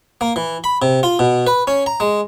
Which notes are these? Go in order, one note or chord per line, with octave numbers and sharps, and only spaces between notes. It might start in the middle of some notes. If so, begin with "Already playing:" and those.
A#3
E3
B5
C3
F4
B2
B4
C#4
A#5
G#3